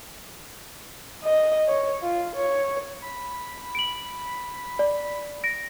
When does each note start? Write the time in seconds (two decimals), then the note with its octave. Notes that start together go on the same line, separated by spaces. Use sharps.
1.25 D#5
1.68 C#5
2.03 F4
2.36 C#5
3.02 B5
3.75 D7 F#7
4.79 D5
5.44 A#6 D7